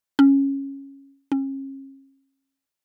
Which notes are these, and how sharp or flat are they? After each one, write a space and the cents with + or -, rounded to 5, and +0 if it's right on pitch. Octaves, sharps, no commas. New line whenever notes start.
C#4 -10
C#4 -35